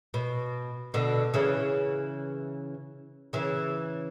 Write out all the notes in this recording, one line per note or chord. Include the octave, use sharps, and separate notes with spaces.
B2
B2 D3
C#3 E3
C#3 E3